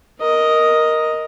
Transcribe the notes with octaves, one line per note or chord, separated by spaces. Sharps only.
A#4 D#5